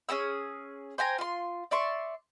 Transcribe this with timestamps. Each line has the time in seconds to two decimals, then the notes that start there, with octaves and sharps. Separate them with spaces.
0.09 C#4 G#4 D#6 E6
0.98 C5 G5 G#5 A#5
1.18 F4 C6
1.71 D5 E5 C6 C#6